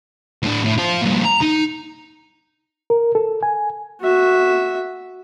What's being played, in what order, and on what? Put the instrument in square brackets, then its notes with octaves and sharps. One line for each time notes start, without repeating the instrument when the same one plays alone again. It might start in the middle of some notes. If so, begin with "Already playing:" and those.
[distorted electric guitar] A2 D4
A2
F4 C5
G2 A#2
A#5
D#4
[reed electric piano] A#4
A4
G#5
[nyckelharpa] F#4 E5